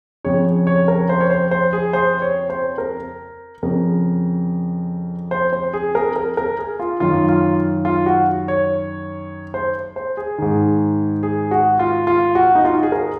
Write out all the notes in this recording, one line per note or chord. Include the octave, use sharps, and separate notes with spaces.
F2 C#3 C#5
C#5
A#4
C5
C#5
C5
C5
G#4
C5
C#5
C5
A#4
F2 C#3 A#4
C5
C5
G#4
A#4
A#4
A#4
G#4
F4
F#2 D#3 F4
F4
F4
F#4
C#5
C5
C5
G#4
G#2 D#3
G#4
F#4
F4
F4
F#4
D#4
F4
F#4
G#4
A#4